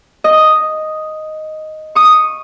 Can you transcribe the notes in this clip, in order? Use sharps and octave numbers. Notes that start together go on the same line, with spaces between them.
D#5
C#6 D#6